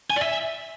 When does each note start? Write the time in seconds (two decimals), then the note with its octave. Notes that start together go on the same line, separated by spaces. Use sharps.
0.10 G#5
0.16 D5
0.22 E5